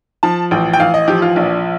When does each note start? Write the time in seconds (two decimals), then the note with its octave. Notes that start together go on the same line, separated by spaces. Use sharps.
0.23 F3 A5
0.51 A1 G5
0.73 G5
0.80 A1 F5
0.94 D#5
1.08 F3 G4
1.22 F4
1.36 A#1 D4